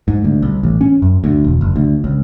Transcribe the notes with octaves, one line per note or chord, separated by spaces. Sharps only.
G#2
D2
C2
A1
C#4
F#2
D2
E1
F#1
D2
C#2